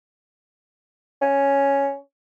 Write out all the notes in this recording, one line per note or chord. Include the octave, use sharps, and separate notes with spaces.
C#4